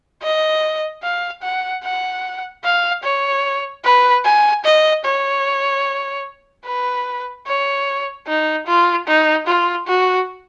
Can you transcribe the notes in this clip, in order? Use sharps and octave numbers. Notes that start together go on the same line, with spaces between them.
D#5
F5
F#5
F#5
F5
C#5
B4
G#5
D#5
C#5
B4
C#5
D#4
F4
D#4
F4
F#4